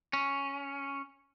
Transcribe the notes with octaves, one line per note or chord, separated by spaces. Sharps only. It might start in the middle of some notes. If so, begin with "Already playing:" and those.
C#4